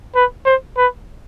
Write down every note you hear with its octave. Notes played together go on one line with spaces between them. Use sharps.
B4
C5
B4